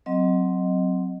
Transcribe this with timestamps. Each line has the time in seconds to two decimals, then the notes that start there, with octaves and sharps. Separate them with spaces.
0.06 F#3 C4 D#5